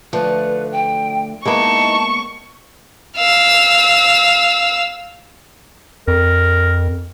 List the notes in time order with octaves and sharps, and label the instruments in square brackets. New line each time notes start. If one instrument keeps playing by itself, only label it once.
[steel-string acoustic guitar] D2 D3 A3 [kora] F3 [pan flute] B4
[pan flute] G5
[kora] G#3 A#3 B3 [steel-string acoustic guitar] D#4 E4 [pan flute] A5 [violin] C#6
[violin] F5 E6
[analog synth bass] F2 [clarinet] A#4